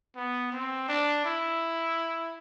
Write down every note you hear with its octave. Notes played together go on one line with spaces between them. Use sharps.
B3
C4
D4
E4